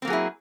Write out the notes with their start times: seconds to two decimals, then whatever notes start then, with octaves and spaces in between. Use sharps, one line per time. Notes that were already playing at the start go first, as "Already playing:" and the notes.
0.02 C4
0.05 A#3
0.07 F#3
0.10 G#4
0.13 E4